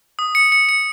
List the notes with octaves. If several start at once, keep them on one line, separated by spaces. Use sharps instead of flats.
D#6
C#7
C#7
C#7